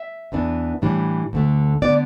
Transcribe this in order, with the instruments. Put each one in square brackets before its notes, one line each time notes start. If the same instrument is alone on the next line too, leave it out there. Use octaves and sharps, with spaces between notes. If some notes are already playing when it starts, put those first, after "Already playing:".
Already playing: [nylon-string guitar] E5
E2 E3 B3 D4
A2 E3 G3 D4
D2 D3 A3
D3 B3 D5